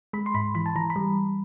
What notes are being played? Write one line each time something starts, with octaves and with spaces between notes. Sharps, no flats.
G#3 B5
C6
G#2 B5
E3 B5
A5
E3 A#5
B5
G3